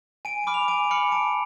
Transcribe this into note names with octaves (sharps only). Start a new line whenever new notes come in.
G#5 D7
B5 D6 F6 D7
F7
G#5 D7
B5 D6 F6 C#7
A5 D7